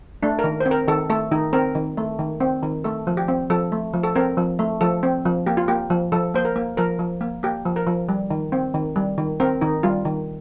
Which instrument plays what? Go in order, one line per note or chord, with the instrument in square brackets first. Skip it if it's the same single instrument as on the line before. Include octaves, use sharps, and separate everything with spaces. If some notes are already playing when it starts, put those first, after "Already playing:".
[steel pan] A3 D4
A#4
D#3
C5
C4
A#4
D#3 A4
A3 A4
D#3 D#4
C4 A#4
D#3
A3
D#3
C4
D#3
A3 A4
F3
G4
C4
F3 A4
A3
F3
A4
C4 A#4
F3
A3
F3 A4
C4
F3
A#3 G4
F4
A#3 G4
F3
F3 A4
A#3 C5
A#4
A#3
F3 A#4
F3
A#3
A#3 G4
F3
A#4
F3
G3
D#3
C4
D#3
G3
D#3
C4 A#4
D#3 D#4
G3 F4
D#3